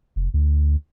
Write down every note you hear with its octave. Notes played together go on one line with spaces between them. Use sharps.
F1
D2